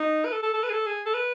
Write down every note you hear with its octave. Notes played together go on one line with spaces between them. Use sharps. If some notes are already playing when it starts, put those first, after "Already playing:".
Already playing: D#4
B4
A4
A4
A4
B4
G#4
A4
G#4
A4
B4